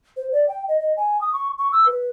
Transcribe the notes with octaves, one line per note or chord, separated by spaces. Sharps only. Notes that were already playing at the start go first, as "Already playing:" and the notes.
C5
D5
G5
D#5
D#5
G#5
D#6
C#6
C#6
E6
B4